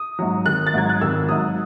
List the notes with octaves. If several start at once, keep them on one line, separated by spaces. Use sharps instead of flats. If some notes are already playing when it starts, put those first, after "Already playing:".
Already playing: D#6
G#2 F#3
G#1 F#6
A6
G#2 F#3 G#6
F#6
G#1 E6
G#2 F#3 D#6